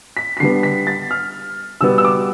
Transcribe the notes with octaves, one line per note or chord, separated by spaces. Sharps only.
B6
B6
D3 G3 B3 C7
B6
A6
F6
B2 G3 B3 E6
E6
D6